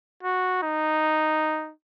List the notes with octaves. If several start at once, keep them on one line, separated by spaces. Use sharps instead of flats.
F#4
D#4